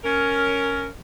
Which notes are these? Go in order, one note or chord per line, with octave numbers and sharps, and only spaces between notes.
C#4 A#4